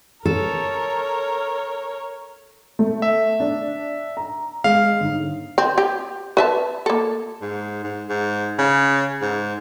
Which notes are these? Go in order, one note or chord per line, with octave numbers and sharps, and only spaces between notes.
A4 A#4 C#5
A3
E5
D4
A#5
G#3 F5
G1 G#2
C4
G4
B4 E5 A5
A#3 A4
G#2
G#2
G#2
C#3
G#2